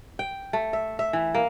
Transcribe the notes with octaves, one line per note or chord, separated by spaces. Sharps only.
G5
A3
E5
E5
E3
A#3